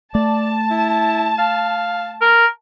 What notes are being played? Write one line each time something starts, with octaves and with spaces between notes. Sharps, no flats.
A3 D5 A5
E4
F5
A#4